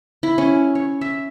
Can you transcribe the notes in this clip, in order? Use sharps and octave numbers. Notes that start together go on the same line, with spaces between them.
E4
C#4
C#5
E5